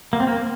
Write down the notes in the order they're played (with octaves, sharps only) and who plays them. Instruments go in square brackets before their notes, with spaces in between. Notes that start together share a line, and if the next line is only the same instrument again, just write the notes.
[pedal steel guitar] A#3
C4
A#3